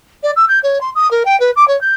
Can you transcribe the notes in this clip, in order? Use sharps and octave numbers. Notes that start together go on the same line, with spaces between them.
D5
E6
G6
C#5
C6
D#6
A#4
G5
B4
D6
C#5
G6